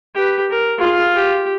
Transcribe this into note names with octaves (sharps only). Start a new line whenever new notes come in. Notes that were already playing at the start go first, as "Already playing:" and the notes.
G4 B4
A#4
F4 G#4
G4